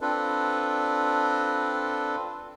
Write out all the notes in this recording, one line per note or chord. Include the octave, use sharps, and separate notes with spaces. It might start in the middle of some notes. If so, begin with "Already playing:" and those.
C4 D4 F4 A4 B4